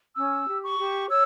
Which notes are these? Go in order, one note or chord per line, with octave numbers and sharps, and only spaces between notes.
C#4 E6
G4
C#6
G4
C#5 E6